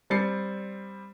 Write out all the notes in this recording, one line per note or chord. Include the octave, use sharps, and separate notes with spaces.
G3 C4 A6 C7 C#7